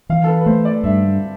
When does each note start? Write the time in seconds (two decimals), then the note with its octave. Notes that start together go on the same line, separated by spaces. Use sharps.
0.09 E3 F5
0.24 A4
0.28 B4
0.41 B4
0.46 A3 C5
0.65 D5
0.83 G2 E5